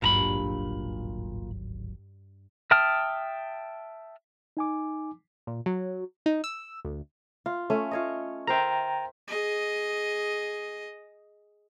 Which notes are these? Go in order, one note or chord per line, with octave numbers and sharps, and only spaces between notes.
D1 G#1 G2 A#2 F#3 A#5 B5
E5 G5 A5 D#6 F6
D#4 G#5 D6
A#2
F#3
D#4
E6
D2
F4
A3 C#4
F4 C#5 D#5
A#4 C5 E5 G5 A#5
G#4 D#5